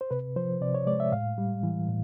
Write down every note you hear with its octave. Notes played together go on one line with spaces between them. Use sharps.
C5
C3 B4
F3 C5
C3 D5
C#5
G#3 D5
E5
A2 F5
G3
E3
A2